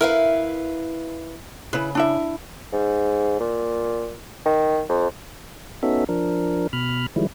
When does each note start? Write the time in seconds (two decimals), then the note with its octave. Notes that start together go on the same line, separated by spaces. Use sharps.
0.01 E4 A#4 B4 F5
1.73 C#3 E4 B4
1.95 D4 E4 E5
2.73 G#2
3.40 A#2
4.46 D#3
4.89 F2
5.83 B3 C#4 D#4 F#4 A4 E5
6.09 F3 D4 A#4
6.73 B2 B5 F6
7.16 D#3 F3 G3 G#3 E4